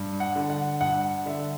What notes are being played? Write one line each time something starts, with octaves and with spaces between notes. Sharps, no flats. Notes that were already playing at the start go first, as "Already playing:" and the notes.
Already playing: G2
F#5
D3
F#5
G2 F#5
D3 E5